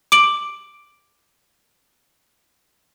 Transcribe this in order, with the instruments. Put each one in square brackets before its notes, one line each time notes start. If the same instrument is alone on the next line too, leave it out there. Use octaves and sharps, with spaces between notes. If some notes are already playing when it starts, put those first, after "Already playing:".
[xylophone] D6 D7 F#7